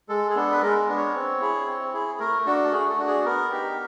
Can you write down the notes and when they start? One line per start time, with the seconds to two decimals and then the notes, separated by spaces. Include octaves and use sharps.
0.09 G#3 A4
0.30 G#4
0.35 B3 D4 A4
0.51 B4
0.62 G#3 A#4
0.88 B3 D4
0.97 C#5
1.14 C4
1.41 E4 G#4
1.67 C4
1.93 E4 G#4
2.20 A3 A#4
2.46 D4 F#4 A4
2.72 A3 G#4
2.90 A4
2.98 D4 F#4
3.08 G#4
3.25 B3 A#4
3.51 D#4 G4